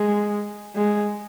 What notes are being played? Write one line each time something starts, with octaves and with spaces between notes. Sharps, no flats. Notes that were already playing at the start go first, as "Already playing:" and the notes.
Already playing: G#3
G#3